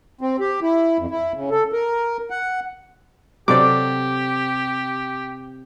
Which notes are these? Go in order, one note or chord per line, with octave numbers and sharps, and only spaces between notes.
C4
G4
E4
F2
E4
C#3
A4
A#4
F#5
C3 F#3 C4 G4 A4 D5 D6